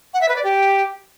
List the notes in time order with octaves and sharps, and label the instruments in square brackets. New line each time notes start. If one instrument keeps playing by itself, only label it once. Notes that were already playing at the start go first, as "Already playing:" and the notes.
[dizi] F#5
E5
B4
D5
G4